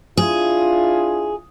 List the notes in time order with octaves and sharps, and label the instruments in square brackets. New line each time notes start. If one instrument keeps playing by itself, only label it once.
[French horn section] D4 E4 F4 [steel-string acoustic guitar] G#4